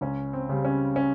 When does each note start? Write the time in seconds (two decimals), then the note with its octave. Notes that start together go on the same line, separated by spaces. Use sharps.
0.01 C#2 C#4
0.33 C4
0.49 C#3 G3
0.65 C#4
0.96 C#4